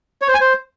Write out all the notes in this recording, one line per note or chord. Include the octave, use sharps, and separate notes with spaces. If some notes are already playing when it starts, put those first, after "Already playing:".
C#5
C5
G#5
C5